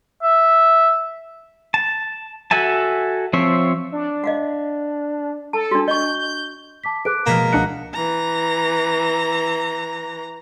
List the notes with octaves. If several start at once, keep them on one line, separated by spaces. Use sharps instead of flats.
E5
A5
F#4 A4 E5 G#5 A5
F3 C4 C#5 E5
D4
D#5 F5 F#5
A4 A5
D4 F#4
D#5 C#6 G6
G6
A5 D6 B6
G#4 A4 B4 D6 F#6 D7
B2 F3 G#3 A#3 F6 B6 E7
C#2 D4 D#5 F#5 F#6 C#7
E3 A#5